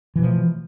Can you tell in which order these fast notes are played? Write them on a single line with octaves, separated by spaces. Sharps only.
E3 B2 F3 A3